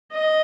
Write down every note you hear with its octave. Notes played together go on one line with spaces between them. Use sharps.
D#5